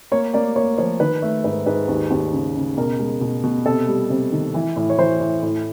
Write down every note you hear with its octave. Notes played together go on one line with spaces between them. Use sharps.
A#3 C#5
A#3 D5
A#3 C#5
F3 C#5
D#3 B4
A3
G#2 B4
G#2 B4
D#2
D#2
C#3
C#3
B2 A#4
G#3
B2
B2
C3 A4
G3
C3
D#3
E3
A2
C#5
E3 C5
A2
A2